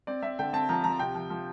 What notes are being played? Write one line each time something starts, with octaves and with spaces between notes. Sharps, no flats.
C4 D5
C4 E5
D3 G5
C4 A5
F3 A#5
F3 A#5
A5
C3 G5
F3
F3